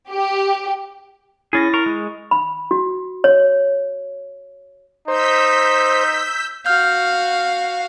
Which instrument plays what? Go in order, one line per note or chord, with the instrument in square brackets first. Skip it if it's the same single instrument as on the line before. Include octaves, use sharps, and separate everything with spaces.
[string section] G4
[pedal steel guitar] C#4 G#4 [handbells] E4 A6 A#6
[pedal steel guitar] A#4 [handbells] C#6
[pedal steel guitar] G#3
[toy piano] B5
F#4
C#5
[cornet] D#4 [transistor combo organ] C5 [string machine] E6 G6 B6
[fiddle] F#4 F5 [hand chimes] F6 G6